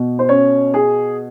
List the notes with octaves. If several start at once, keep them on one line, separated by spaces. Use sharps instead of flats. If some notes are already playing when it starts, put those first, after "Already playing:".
Already playing: B2
C5
C#4 C#5
G#4